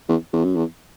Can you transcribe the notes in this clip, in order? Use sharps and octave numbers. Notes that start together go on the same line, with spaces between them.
E2
E2
F#2
E2